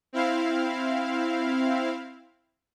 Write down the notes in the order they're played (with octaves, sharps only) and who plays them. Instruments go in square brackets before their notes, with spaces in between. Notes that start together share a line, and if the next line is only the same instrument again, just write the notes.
[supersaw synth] C4 E4 F5